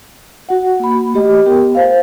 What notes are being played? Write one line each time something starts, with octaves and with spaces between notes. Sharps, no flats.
F#4 F#5
A#3 B5
A3 G4 D#5
B3 G4 A#4 G5
C5 F5